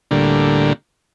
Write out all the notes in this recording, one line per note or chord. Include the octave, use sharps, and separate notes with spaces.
D2 A2 D3 G3 A#3